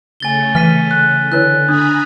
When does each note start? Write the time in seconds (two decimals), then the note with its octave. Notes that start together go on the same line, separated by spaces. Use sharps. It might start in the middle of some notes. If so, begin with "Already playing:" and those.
0.20 C#3 A3 C#4 G#5 A6 G7
0.55 E3 F6 B6 D#7
0.91 F#6
1.32 D3 E4 B4 C#5 F#6
1.68 D4 G#5 A#5 B5 D#6